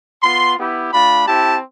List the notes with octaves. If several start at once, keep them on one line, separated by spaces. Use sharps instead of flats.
B3 F4 C6
B3 E4 G4
A3 D4 F4 B5
C4 E4 G4 A5